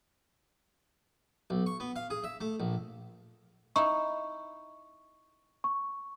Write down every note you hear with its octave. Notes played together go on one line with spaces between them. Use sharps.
B1
C#6
B3
F5
G#4
E5
A3
A#1
D#4 E4 C#6
C#6